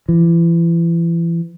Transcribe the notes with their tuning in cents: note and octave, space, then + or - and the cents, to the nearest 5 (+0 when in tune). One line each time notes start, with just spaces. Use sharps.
E3 +35